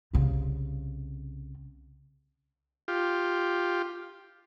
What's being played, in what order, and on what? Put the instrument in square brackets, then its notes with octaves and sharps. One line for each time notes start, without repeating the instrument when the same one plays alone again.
[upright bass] C2 C#3
[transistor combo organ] F4 G4